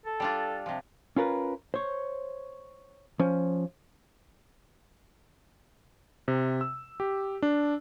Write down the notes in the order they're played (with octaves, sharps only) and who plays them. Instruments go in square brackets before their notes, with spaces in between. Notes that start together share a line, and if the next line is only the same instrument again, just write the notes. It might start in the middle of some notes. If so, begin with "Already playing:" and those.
[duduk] A4
[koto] G3 D4 F4
C3 F3
[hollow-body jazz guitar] C#4 F4 A#4 B4
C5 C#5
F3 C#4
[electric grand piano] C3
E6
G4
D4